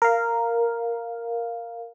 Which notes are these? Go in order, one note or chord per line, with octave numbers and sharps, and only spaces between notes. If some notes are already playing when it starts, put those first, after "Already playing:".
A#4 F5